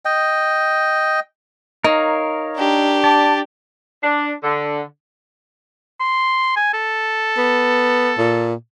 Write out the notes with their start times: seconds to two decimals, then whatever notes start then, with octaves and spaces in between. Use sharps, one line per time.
0.05 D#5 G5
1.84 D#4 A#4 C#5 F5
2.57 D4 G4
3.04 D5 A5
4.02 D4
4.44 D3
6.00 C6
6.56 G#5
6.73 A4
7.38 B3
8.18 A#2